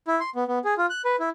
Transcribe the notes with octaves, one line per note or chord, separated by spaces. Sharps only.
E4
C6
B3
B3
G#4
F4
F#6
B4
E4